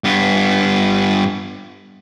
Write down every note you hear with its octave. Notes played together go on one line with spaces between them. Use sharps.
G2 B3